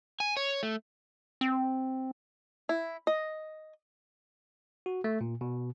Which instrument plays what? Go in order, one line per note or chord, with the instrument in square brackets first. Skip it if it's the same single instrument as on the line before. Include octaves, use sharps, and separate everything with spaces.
[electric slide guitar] G#5
C#5
A3
[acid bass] C4
[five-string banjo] E4
D#5
[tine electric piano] F#4
A3
A#2
B2